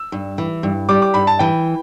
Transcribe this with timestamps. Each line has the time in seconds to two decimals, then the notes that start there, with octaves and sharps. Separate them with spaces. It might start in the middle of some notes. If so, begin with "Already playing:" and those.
Already playing: E6
0.12 G2
0.38 E3
0.63 G2
0.89 G3 D6
1.02 D6
1.14 G2 B5
1.27 A5
1.39 E3 G5